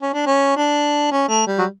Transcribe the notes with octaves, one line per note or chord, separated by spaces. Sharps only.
C#4
D4
C#4
D4
C#4
A3
G3
F#3